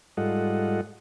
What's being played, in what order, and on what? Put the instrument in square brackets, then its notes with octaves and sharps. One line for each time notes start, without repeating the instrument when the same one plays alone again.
[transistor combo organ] G#2 G3 F4 A4 D#5 F#5